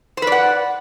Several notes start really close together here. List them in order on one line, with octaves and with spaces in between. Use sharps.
C5 B4 D5 F#5